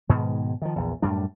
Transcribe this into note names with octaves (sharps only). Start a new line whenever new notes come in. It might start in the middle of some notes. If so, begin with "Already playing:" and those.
G#2 B2 D#3 G#3
D#3 F3
A#1 E2
F#2 A2 G3 D4